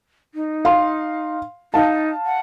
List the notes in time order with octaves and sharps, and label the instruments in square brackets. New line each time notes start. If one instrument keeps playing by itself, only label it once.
[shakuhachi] D#4
[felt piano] F5 C6
[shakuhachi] D#4 [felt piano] F5 A5
[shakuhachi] F#5